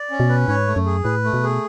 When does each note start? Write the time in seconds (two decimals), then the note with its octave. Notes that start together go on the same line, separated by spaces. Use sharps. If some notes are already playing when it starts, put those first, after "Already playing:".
Already playing: D5
0.11 C#4
0.20 B2
0.29 B4
0.48 G#2 C#5
0.67 A3
0.76 F#2
0.86 G#4
1.04 A2 B4
1.24 A3
1.33 B2
1.43 G#4